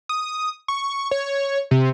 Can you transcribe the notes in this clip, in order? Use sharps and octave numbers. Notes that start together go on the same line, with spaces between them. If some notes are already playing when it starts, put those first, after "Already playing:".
D#6
C#6
C#5
C3